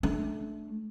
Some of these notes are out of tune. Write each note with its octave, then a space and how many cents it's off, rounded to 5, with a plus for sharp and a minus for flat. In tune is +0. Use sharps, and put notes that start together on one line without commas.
A3 -20 D4 +0